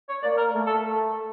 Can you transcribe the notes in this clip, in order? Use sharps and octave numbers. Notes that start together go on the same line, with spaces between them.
C#5
A#3 D5
A#4
A3
A4